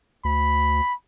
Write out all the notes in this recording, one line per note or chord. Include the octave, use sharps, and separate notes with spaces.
D2 B5